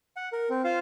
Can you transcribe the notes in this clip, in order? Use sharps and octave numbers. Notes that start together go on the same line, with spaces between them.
F#5
A#4
C4
F4 C5 F5